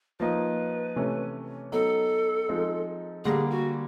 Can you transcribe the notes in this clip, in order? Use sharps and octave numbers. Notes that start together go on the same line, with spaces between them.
F3 A#3 D#4 B4
C3 E3 A3 C#4
F#3 B3 D#4 A4
F3 G#3 C4 D#4
D3 G3 A#3 G#4
F#4